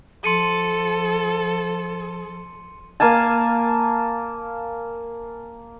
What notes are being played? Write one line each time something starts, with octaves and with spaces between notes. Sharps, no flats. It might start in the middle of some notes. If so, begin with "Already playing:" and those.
F3 A4 C6 C#7 D#7
A#3 F5 G#5 A5